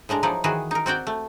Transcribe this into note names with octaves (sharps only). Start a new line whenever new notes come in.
A2 G#3 D4 A#5
F3 F#3 D#4 E4 A#4 D5
D#3 E3 F#4 G#4
D#4 A#4
C4 F#4 D5 G5
A3